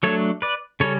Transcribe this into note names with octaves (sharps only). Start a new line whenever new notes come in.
F#3 A3 D4 A4 C#5
B4 D5
C#3 G3 C#4 A4 C#5